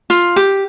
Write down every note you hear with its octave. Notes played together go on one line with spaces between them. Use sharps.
F4
G4